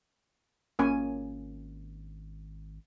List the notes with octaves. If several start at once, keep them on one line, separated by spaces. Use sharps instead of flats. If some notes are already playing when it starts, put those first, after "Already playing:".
G#1 A#3 C#4 G#5